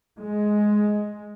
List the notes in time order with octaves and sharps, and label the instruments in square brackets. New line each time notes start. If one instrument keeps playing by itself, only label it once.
[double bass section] G#3